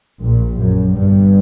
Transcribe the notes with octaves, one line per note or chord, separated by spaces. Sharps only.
A#1 A#2
F#2
G1 G2